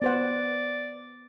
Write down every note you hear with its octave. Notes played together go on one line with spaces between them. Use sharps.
B3 C5 D5 F#5